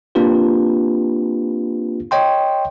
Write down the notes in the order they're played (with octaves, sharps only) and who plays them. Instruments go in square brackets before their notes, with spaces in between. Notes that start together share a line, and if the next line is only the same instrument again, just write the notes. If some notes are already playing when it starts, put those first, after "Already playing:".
[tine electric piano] A#3 C4 D4 F4 G4 B4
C#5 D#5 G5 C6